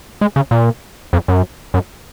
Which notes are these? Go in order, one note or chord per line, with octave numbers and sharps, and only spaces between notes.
G#3
C#3
A#2
F2
F#2
F#2